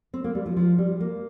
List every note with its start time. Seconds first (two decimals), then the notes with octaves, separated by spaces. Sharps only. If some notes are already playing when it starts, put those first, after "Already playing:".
0.13 C4
0.24 A#3
0.35 G3
0.46 F3
0.56 F3
0.78 G3
1.00 A#3